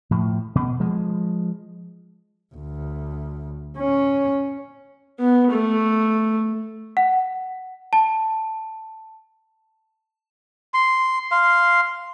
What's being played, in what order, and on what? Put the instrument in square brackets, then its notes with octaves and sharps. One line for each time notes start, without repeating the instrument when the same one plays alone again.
[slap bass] A2 F3
B2
F3 G#3
[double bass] D2
C#4
[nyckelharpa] B3
A3
[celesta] F#5
A5
[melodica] C6
F5 C6